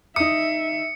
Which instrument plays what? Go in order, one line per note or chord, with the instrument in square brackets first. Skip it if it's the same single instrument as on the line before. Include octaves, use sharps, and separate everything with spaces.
[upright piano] D#4 D#6 [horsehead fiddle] E5 [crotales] C#7